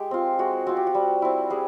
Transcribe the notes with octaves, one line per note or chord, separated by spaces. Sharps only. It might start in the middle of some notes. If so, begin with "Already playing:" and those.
Already playing: G#3 G4
C4 F4
G#3 F#4
C4 F4 F#4
G4
F#4
G3
C4 E4
G3 G#4